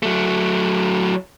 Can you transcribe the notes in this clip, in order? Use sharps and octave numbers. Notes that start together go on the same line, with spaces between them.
F#3 A3